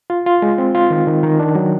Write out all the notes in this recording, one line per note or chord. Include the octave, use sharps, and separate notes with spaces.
F4
F4
G#3
C4
F4
D#3
D#3
D#3
D4
F#3